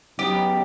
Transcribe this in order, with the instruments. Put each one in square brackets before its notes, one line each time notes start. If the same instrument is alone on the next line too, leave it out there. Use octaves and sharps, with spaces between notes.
[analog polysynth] C#3 F#3 B3 D#4 [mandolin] G4